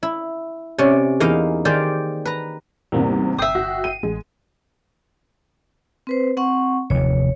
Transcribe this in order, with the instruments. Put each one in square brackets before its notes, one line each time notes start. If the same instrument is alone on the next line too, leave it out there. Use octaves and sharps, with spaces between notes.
[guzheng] E4
C3 C#4 D5
E2 A#3 D#4 D#5 F5
D#3 G4 G#4 C5 D5 F5
B4 A#5
[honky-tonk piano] E2 G#2 C3 [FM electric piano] G3 A#3
[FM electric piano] G1 G5 C7 [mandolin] E5 D#6
[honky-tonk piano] F#4
D#7
[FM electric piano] A1 [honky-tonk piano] G#3
[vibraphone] C4 B4 C5
C4 F#5 C#6
[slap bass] F1 D#2 [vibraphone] C#5